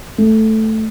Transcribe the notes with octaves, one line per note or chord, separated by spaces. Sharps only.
A3